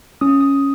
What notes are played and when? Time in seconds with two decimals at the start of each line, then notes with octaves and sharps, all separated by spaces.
0.21 C#4 D#6
0.40 D#6